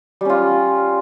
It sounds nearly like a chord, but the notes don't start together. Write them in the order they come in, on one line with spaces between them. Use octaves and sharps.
G3 C#4 F4